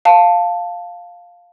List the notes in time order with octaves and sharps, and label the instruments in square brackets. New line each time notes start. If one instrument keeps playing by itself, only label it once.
[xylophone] F5 A5